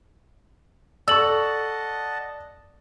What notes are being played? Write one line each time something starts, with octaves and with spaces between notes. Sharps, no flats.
A4 D5 D#5 F#5 A5 C#6 E6 F#7